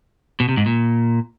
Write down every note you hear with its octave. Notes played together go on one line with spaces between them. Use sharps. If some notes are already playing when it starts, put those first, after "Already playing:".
B2
C3
G#2
A#2